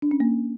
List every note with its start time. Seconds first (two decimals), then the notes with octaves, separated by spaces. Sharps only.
0.02 D4
0.11 C#4
0.20 A#3